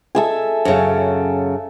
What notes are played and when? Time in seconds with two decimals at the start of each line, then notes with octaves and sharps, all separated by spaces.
0.15 A4 E5 G#5
0.65 F#2 C#3